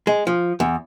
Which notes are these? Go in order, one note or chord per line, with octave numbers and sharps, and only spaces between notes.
G#3
F3
E2